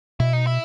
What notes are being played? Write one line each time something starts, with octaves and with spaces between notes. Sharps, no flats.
B2 E4
D#4
E4